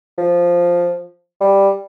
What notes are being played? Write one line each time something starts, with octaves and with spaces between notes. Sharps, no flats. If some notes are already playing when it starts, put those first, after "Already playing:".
F3
G3